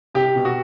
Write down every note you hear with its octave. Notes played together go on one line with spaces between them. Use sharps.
C2 G4
B2
F#4